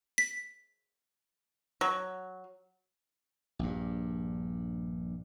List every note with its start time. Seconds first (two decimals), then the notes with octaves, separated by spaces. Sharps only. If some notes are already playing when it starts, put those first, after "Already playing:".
0.18 B6
1.81 F#3
3.59 A#1 G2